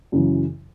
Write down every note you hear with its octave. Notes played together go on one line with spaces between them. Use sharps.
F#2 C#3 E3